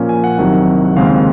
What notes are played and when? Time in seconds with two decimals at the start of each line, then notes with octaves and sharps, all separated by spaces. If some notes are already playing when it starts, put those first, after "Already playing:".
Already playing: A#2 F3 A#3 C#4
0.09 G#5
0.24 F#5
0.38 C2 C3 D#3 F#3 F#5
0.85 F#5
0.96 D#2 C#3 G#3 C4 F5